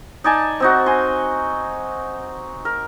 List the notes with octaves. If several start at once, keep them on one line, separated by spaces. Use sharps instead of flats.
D#4 D5 G#5 A5
C4 D#4 F#4
G#5 C6
A#4